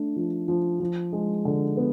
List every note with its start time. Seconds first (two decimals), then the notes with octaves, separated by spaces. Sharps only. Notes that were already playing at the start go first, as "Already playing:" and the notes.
Already playing: A3 D4
0.16 F3
0.48 F3
0.80 F3
1.12 G#3
1.45 D3
1.77 B3